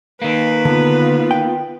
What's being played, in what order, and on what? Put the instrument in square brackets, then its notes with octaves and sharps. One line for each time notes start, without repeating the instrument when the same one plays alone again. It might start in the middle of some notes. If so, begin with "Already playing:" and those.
[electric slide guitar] D#3 A#3 [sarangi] B4
[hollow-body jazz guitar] D3 [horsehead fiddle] B3 F4
[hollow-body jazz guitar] G5